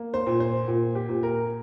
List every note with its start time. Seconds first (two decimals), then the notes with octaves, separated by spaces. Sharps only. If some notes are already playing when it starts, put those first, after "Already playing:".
Already playing: A#3
0.14 C5
0.27 A#2
0.40 C5
0.68 A#2
0.95 G4
1.09 A#2
1.23 A#4